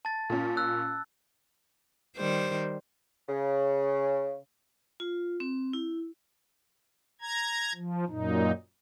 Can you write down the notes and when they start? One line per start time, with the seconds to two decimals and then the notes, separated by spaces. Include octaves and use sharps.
0.05 A5 A6
0.30 A#2 C#4
0.57 E6 F#6
2.17 D#3 G3 C5
3.29 C#3
5.00 F4
5.40 C4
5.73 E4
7.21 A#5 G#6
7.75 F3
8.08 F#2 A#2 D#4